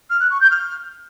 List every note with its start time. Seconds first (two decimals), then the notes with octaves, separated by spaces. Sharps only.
0.10 F6
0.20 F#6
0.30 C#6
0.40 G6
0.51 F6